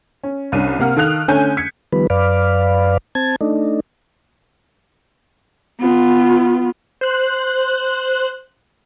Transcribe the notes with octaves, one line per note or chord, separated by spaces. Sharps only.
C#4
C2 C#4 D4 D#7
C3 A#3 F5 F#5 F6
D#3 A4 F5 D#6 F#6 F7
D3 A3 C#4 G#5 G6 D#7
G#6 B6 C#7
D#3 F3 G3 B3 B4
F#2 B4 D5 F5
C4 A5 G#6
A3 D4 D#4
B3 F4
C5 F#6